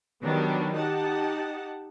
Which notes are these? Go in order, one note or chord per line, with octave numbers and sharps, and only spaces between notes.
D#3 F#3 G3 B3 D4
D#4 G4 F#5 A5